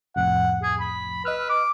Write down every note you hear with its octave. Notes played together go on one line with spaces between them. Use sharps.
C2 F2 A2 F#5
G#4
B5
B4 D#5 E6 F6
D6